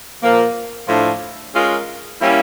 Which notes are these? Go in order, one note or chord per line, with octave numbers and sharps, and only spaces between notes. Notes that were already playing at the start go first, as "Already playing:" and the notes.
A#2 F3 A#3
A2 F3 A3 D4 F4
G#3 C#4 F4 A#4
G3 A#3 C#4 E4